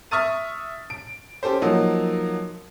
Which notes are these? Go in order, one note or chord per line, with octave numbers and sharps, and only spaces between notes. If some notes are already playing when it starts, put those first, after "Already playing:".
E5 C#6 D#6 F6 A6 D#7
D7
C#4 G4 A4 C5
F3 F#3 A#3 D#4